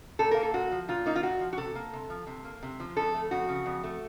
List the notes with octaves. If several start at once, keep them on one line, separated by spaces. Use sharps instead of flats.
A#2 A4
A#4
A#3
A4
A#2 F#4
F3
A#2 F4
A#3 D#4
F4
A#2 F#4
F3
F#4
C3 A4
A#3
C3
F3
C3
A#3
C3
F3
F2 A4
A3
F2 F#4
C#3
F2
A3